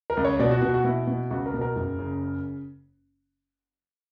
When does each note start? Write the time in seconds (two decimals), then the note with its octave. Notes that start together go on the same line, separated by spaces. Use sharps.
0.10 A#4
0.17 C#2
0.25 C#5
0.39 B2 D5
0.51 F#4
0.62 B2 F#4
0.74 F#4
0.85 B2 E4
1.07 B2
1.31 C#2 F#4
1.46 A#4
1.54 B2
1.61 A#4
1.76 F#1
1.99 C#3